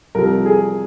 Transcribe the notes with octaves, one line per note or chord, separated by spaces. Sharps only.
C2 C3 F3 A#4
G#4